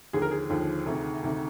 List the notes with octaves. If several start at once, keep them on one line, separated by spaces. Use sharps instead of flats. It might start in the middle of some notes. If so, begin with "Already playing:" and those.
D#2 D3 F3 G#4
A#4
G#4
D#2 D3 F3
D2 C3 D#3
D2 C3 D#3